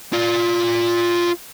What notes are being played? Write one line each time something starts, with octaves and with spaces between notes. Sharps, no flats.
F4 D5